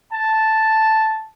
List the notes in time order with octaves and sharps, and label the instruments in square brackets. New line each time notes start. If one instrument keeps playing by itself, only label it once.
[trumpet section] A5